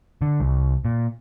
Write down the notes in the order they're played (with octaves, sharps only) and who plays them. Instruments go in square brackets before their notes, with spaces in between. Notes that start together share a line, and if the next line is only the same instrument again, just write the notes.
[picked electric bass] D3
C2
A#2